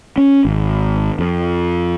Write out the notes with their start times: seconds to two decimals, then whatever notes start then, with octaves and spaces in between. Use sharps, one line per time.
0.18 C#4
0.45 G#1
1.19 F2